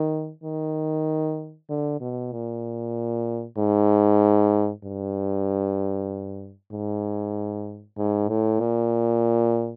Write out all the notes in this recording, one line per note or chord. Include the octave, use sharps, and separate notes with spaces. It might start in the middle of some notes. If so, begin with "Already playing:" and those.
Already playing: D#3
D#3
D3
B2
A#2
G#2
G2
G#2
G#2
A2
A#2